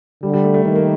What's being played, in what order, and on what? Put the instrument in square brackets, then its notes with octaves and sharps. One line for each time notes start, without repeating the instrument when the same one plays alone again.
[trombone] D3 [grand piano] G3
[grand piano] G3
A3
A3
[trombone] D#3 [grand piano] A#3
[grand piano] A#3